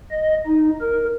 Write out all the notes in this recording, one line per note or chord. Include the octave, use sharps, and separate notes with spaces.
D#5
D#4
A#4